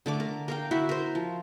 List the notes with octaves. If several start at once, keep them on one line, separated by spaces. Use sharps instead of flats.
D3 A3 D6
A#4
A#4 F5 G5
E4 F#4 E5
A#4 C5
F3